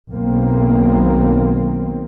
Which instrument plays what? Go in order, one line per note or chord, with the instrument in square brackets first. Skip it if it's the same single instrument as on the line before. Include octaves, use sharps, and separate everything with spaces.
[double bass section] B1 D#3 A#3 C4